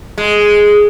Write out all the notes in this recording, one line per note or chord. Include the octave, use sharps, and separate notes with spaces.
G#3